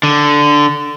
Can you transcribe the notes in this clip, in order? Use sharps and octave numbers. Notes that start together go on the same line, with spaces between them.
D3